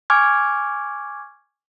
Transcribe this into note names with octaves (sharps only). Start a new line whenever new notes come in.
G#5 C#6 D6 F6 G#6